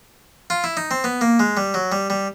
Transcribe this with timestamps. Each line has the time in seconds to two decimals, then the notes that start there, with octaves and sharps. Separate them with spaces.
0.50 F4
0.64 E4
0.77 D#4
0.91 C4
1.04 B3
1.21 A#3
1.39 G#3
1.57 G3
1.74 F#3
1.92 G3
2.10 G3